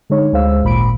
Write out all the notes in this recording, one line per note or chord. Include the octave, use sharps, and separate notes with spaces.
D3 G#3 D#4 C#5
D2 G#3 C5 F5 E6
G#1 A#2 B5 D7